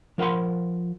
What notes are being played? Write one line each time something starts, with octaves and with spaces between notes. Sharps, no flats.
F3 A#4 F#5 B5 C6